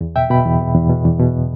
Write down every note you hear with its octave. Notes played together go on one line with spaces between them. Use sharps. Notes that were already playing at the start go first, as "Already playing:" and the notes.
E2
B2 E5 G5
B2 G5 B5
E2
B2
E2
B2
E2
B2